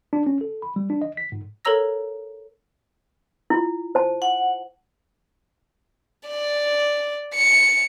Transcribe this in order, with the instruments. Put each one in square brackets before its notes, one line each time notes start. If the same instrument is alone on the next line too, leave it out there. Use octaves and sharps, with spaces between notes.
[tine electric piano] D4
C#4
A4
B5
G3
D4
D#5
B6
G#2
[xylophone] A4 A#4 C#5 A#5 E6 A#6
[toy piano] E4 F4
C5 A5
[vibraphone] F#5
[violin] D5
C#7